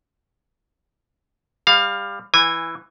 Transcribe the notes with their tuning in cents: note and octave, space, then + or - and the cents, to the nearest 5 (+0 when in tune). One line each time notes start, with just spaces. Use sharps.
G3 +25 F5 +10
E3 +5 G#5 -20